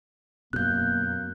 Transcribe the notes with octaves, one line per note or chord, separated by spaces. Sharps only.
F#2 B2 A#3 F#6 G6